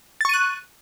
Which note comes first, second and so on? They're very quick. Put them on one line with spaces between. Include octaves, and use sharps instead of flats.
A6 C#6 D#7 F#6